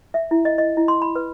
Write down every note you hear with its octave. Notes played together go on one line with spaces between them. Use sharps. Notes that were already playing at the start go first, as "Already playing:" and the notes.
E5
E4
D#5
D#5
E4
C6
B5
B4